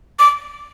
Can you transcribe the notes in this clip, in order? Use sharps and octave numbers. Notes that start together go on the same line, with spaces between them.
D6